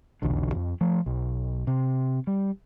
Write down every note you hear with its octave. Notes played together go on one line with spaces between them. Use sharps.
F1 B1 E2 D3
F2
F3 A3
B1
C3
G3